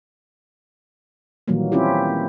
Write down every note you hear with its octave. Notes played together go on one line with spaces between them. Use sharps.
A#2 D#3 E3 F#3 G3 A#3
C4 C#4 E4 F4 G4